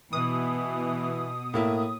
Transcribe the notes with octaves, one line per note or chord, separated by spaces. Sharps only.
B2 E3 D#6
A2 A#3 E4